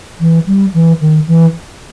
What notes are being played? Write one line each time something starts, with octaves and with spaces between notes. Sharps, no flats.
E3
G3
E3
D#3
E3